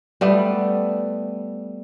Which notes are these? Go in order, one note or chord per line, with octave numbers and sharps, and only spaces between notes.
G3 A3 B3